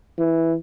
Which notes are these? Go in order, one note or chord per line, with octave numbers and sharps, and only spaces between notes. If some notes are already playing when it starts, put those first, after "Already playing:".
E3